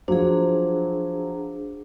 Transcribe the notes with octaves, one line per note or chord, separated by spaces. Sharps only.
F3 F#3 D4 G#4 C5